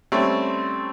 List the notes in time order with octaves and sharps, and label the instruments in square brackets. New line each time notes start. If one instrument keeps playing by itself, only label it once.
[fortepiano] G3 A3 C4 C#4